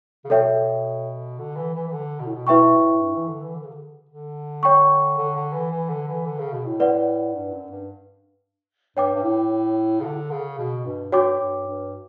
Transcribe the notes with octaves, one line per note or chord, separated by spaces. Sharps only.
C#3
B2 A4 C#5 E5 G5
D3
E3
E3
E3
D3
B2
A2
B2
B2 E4 B4 E5 G5 C#6
A2
G2
E3
D3
E3
D3
C#3
D3
D3
C#5 G5 C#6
D3
D3
E3
E3
D3
E3
D3
C#3
B2
A2
B4 D5 F#5
G2
F#2
G2
G2 C#5 G5 D6
G2
A2
C#3
D3
C#3
B2
G2
G2 F#4 C#5 G5 D6
G2
G2